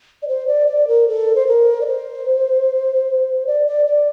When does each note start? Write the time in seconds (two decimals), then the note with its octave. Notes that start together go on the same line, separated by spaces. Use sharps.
0.22 D5
0.28 C5
0.47 D5
0.68 D5
0.88 A#4
1.08 A4
1.35 C5
1.47 A#4
1.81 D5
1.87 C5
3.47 D5
3.67 D5
3.86 D5